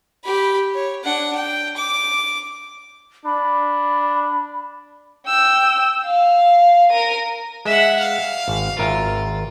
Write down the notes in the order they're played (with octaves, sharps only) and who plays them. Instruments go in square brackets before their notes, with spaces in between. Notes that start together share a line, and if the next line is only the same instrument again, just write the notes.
[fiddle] G4 B5
C#5
D4 F#5
G5
D6
[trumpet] D4 [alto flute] B5
[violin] G5 E6
F5
A#4 D#7
[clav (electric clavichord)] G#3 [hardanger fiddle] E5 F#5
[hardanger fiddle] F5
[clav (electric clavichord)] G#1
[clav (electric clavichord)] G#1 A#4 E5 [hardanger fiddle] F4